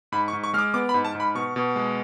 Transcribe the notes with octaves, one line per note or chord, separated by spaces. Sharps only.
G#2 B5
C#6
G#2
C#6
G#3 F6
D6
B3 D6
B5
G#2
A5
G#2
B5
B2 C#6
B2
G#3